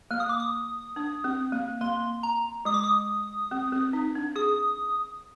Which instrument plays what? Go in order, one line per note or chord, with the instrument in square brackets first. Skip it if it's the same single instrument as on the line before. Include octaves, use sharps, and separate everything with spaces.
[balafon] A#3 [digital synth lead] F6
[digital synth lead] D#6
D6
D#6
[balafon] D4
C4
A#3
[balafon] A#3 [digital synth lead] C6
[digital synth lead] A#5
[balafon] G#3 [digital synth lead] D#6
[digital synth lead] D6
D#6
[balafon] C4
C4
D#4
D4
[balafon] G#4 [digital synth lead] D#6